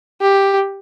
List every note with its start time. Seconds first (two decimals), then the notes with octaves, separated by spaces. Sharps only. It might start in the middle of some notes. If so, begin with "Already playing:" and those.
0.21 G4